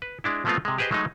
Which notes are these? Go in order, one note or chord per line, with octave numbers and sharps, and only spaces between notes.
B4
G#3 D4 E4
F3 G#3 A3 B3 C4 F4
C3 G#3
G4 G#4 B4 C5 D#5
F#3 G#3 A3 D#4